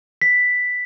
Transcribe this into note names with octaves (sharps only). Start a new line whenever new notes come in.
B6